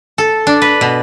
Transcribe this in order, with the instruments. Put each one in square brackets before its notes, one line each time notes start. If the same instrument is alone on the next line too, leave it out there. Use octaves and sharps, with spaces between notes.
[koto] A4
D4
B4
B2